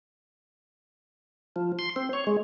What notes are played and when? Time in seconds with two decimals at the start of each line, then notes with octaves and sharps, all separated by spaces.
1.56 F3
1.79 C6
1.96 C4
2.13 C#5
2.27 G#3